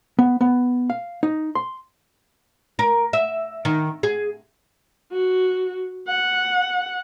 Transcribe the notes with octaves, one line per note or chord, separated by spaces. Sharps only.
B3
B3
F5
D#4
C6
A#4
E5
D#3
G#4
F#4
F#5